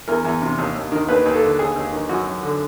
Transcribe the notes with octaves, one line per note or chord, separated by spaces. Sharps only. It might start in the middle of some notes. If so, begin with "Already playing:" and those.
E2 A#4
E2
C3
D#2
D#2
D#3
D#2 B4
D#2
A4
D3
D#2 G#4
D#2
D#3
F#2 F#4
F#2
D3